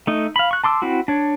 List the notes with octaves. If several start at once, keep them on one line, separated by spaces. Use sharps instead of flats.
A3 D#4
F5 B5
C#6 F#6
A5 C6 D6 E6
C4 E4 F#4
D4 C#5